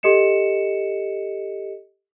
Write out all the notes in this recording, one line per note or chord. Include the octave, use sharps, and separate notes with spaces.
G4 A4 D#5 C#7 E7